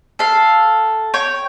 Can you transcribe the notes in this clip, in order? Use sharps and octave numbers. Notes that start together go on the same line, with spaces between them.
A4 F5
C#5 G5